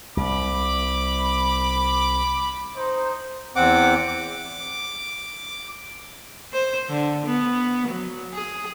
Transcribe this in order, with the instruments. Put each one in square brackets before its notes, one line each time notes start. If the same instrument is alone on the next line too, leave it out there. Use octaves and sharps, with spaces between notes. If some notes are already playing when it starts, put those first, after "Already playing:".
[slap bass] C2 [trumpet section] B5 D6
[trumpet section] D#4 C5
[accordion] E2 C4 F#5 D6
D6
[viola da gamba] C5
D3
B3
F#3
G#4